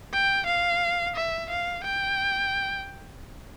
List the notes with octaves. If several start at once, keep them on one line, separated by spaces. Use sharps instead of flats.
G5
F5
E5
F5
G5